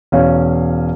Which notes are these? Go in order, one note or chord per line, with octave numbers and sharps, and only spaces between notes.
E1 C#4 F5